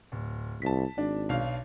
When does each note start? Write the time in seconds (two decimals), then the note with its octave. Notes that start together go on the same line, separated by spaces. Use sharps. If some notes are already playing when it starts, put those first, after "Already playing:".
0.12 D1
0.62 C2 A5 B6
0.98 G#1 D4
1.29 B1 F5